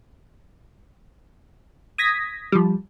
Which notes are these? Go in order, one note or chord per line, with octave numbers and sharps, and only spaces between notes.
D#6 G#6 A#6 B6
F3 G3